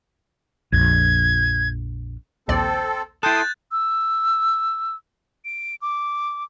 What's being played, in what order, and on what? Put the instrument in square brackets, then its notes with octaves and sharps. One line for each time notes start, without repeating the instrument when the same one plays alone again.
[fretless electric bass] A#1 F2 [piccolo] G#6
[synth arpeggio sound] A#1 D#2 D5 [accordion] C4 A4
[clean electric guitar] E4 A4 [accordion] G5 C6 D#6 [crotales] F#6 G6 A6
[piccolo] E6
D7
D6